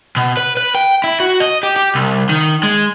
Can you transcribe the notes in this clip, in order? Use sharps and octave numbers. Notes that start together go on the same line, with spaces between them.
B2
B4
B4
G5
E4
F#4
D#5
G4
G4
C2
D#3
G#3